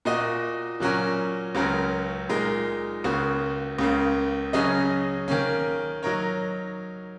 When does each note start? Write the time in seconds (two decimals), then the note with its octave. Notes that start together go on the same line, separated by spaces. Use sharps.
0.05 A#2 A#3 F#4 D#5
0.80 A#2 F#3 C#4 F#4 A#4
1.55 C#2 C#3 F#3 C#4 A#4
2.29 A#2 G#3 D#4 A#4
3.04 C#2 C#3 A#3 F#4
3.79 C#2 C#3 A#3
4.53 C#3 F#3 C#4 G#4 D#5
5.28 D#3 A#3 C#4
6.03 F#3 D#4 A#4 C#5